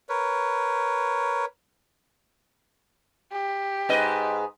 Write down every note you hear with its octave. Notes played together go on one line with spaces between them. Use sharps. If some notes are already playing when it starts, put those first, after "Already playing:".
A#4 B4 C#5
G4
G#2 B4 D#5